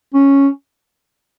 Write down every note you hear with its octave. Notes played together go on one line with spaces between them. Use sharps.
C#4